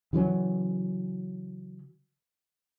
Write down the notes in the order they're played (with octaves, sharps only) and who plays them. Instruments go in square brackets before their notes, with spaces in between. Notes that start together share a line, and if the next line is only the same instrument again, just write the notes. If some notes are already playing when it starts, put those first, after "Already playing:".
[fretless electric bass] C#3 E3 F#3 C#4